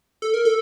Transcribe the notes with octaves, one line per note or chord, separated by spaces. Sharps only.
A4
A#4
A4